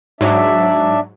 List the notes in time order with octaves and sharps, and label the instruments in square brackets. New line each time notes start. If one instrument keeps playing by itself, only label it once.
[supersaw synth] G#2 F#3 [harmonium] D4 D5 E5